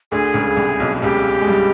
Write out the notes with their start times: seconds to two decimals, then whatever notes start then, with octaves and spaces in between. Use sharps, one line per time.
0.11 D2 D3 G#4
0.34 C#2 C#3
0.57 C2 C3
0.80 B1 B2
1.02 C#2 C#3 G4
1.41 G#3
1.47 G2 G3